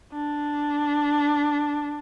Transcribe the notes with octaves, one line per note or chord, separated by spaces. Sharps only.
D4